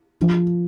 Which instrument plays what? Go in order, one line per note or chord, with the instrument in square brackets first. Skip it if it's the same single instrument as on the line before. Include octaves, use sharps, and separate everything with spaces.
[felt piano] F3